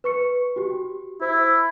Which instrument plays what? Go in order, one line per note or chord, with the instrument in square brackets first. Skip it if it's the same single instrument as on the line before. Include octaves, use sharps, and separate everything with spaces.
[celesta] B4 C#6 C#7
F#4 G4
[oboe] E4 [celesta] C5